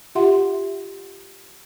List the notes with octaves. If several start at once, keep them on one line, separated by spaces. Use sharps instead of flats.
F4 G4 E5 F#5 C6